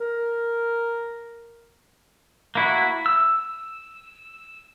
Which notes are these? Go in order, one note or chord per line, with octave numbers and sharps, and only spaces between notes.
A#4
A#3 E4 F#4
E6